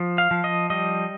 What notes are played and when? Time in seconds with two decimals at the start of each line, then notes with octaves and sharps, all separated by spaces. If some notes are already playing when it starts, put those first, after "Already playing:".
Already playing: F3
0.18 F5
0.31 F3
0.44 D#5
0.70 G3 D#5